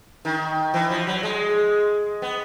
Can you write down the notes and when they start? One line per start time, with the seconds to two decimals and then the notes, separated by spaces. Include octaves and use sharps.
0.25 D#3
0.74 E3
0.90 F3
1.07 F#3
1.23 G#3
2.22 B3